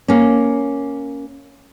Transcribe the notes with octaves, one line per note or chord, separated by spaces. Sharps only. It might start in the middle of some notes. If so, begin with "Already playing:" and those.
A#3 C#4